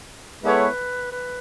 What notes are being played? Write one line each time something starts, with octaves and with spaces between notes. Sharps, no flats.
G#3 B3 E4 A4 B4 C#5
B4